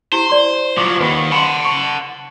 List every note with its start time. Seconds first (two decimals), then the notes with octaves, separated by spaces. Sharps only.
0.12 E4 G4 C5
0.29 D5 C6
0.78 F3 F#3 D6
1.00 D#2 D#3 B4 F#5 B5
1.32 F#5 A5 B5 C6
1.65 C#6